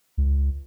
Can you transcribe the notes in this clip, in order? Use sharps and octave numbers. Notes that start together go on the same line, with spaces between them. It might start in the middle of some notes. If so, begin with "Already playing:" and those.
C#2